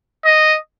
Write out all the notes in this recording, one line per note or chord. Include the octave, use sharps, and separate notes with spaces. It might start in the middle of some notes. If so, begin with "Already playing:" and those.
D#5